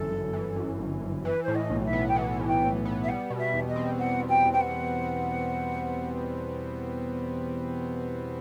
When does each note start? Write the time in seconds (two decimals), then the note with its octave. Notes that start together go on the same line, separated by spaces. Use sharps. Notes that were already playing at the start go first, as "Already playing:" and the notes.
Already playing: G1 F#2 E3 A4
0.10 G1
0.33 E3
0.56 F#2
0.79 G1
1.01 G1
1.25 E3 B4
1.43 A2 C5
1.55 D#5
1.70 B1
1.85 E5
1.93 B3
2.08 G5
2.16 E3 F#5
2.39 A2
2.47 G5
2.62 B1
2.85 B3
3.03 E5
3.08 G3 F#5
3.30 B2
3.38 E5
3.53 E2
3.69 D#5
3.76 C4
3.99 G3 F#5
4.22 B2
4.29 G5
4.45 E2
4.53 G5
4.61 F#5